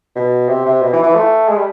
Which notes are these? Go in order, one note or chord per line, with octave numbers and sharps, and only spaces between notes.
B2
C3
C3
B2
E3
E3
A3
G#3
G3